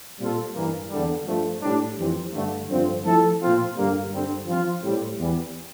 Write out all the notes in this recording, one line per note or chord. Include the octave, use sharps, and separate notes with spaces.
A#2 G3 C4 F4 A4
G2 E3 A#3
E2 D3 G3
G2 F3 A3
A2 G3 D4
F2 E3 G3 C4
G2 D3 A3
G2 D3 F3 C4
F3 A3 E4 A4
A#2 F3 C4 F4
G2 D3 G3 A#3
G2 D3 G3 C4
F3 C4 F4
A2 G3 C4
E2 E3 G3